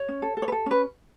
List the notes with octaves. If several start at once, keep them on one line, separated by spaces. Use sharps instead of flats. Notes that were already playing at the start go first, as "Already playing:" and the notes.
Already playing: C#5
C#4
A4
A4
C#5
B4
A4
C#4 B4